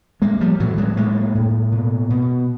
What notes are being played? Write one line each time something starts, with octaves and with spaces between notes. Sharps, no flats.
A2 G#3 A#3
F3 G3
A2 E3 F#3
F#3 G#3
A2 G#3 A#3
A2
B2
B2